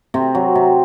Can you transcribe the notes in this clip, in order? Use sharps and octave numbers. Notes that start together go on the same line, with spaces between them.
C3 C4
F#3
C3